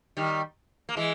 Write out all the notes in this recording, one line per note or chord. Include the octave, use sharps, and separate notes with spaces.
D#3 G3
A#3
E3 G#3